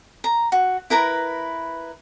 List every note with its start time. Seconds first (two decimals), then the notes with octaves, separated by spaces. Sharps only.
0.24 A#5
0.52 F#4
0.90 E4 A#4 B4 A#5